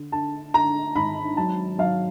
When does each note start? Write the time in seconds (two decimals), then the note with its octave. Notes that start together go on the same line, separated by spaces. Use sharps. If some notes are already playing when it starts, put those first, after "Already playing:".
Already playing: D3
0.12 D3 A5
0.54 D3 A#5
0.95 G#1 B5
1.37 F#3 A5
1.78 F#3 F5